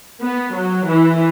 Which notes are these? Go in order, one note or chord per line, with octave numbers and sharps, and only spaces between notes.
B3
F#3
E3